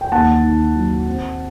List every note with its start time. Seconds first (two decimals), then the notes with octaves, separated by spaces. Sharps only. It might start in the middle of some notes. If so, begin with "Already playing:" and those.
0.01 G5
0.12 D#2 F#5 A5
0.43 D#3
0.76 F#3
1.07 C4